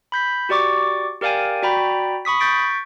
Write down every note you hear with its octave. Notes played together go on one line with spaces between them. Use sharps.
B5 G6 B6
F#4 G4 D5 C#6 D6
G4 A#4 D5 F5 G5 G#5
F#4 D5 G5 A#5 B5
B5 C#6 D#6 B6
C#6 G6 A6 B6 D7